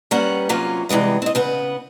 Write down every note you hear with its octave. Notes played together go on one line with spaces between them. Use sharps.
G3 A#3 B3 C#4 F#5
C3 F#3 A#3 C#4 F4
C3 E3 G3 G#3 B3
C4 D#5
C#3 B3 B4